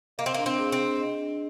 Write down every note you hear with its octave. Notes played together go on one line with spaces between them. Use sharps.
A#3 D#5
C4
A#3 D4
C4
G#4
C4
D4
D#5
D4